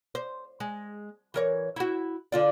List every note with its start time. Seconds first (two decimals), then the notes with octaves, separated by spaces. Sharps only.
0.15 C5
0.60 G#3
1.34 E3 A#4 C#5
1.76 E4 F#4
2.32 D3 F4 D5